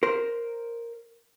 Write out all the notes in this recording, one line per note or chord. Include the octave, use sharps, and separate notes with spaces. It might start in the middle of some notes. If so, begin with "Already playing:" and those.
A#4 C5